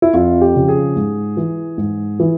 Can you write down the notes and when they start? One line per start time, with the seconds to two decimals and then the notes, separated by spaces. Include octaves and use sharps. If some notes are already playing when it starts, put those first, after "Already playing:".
0.02 E4
0.13 F2 F4
0.41 G4
0.54 C#3 F3
0.68 G#4
0.96 G#2
1.37 E3
1.78 G#2
2.20 E3